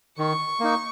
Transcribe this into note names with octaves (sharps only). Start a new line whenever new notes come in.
D#3 C#6
A#3 D#4